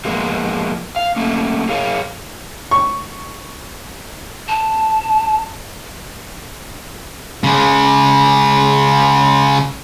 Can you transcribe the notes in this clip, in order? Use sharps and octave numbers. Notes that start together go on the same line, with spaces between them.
F3 G#3 A#3 B3
F5
A3 A#3 C#4
G#4 A#4 C#5 F5
C#6
A5
C#3 G#3